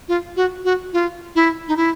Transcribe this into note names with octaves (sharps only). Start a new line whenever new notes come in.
F4
F#4
F#4
F4
E4
D#4
E4